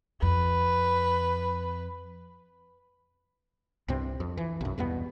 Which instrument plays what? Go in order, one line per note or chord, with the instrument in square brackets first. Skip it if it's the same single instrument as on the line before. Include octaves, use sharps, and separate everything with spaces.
[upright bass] F2 [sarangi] B4
[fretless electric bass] C2 G2 C3 C4
F2
E3
B1 F#2
E2 G2 B2 B3